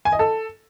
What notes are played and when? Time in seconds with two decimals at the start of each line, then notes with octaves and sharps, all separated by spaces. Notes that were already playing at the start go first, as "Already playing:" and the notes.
0.05 G#5
0.12 D#5
0.19 A4